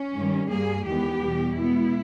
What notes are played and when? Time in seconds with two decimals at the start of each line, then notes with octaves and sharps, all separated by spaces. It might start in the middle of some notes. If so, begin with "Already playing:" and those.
Already playing: C#4
0.15 G2 D#3 G3
0.50 G2 G3 A#3 G#4
0.86 E2 D#3 G#3 B3 G4
1.22 E2 B2 G3
1.57 B2 G#3 B3 E4